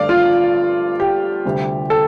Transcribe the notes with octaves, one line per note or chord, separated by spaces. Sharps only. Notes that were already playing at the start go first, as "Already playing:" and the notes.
Already playing: G2 D3 A3 D5 F5
F4
G4
D2 C3 G3
A4